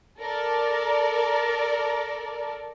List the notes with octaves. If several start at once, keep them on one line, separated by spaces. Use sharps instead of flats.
A4 A#4 D5